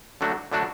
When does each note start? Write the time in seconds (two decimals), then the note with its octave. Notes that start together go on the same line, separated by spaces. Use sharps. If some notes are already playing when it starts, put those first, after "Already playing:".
0.21 D3 F#3 A3 D4 F#4
0.52 D3 F#3 A3 D4 F#4